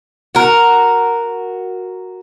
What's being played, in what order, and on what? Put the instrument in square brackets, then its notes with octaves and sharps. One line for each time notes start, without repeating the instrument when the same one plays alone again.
[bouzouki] F#4 A#4